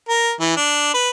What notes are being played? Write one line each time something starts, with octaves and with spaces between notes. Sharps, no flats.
A#4
E3
D4
B4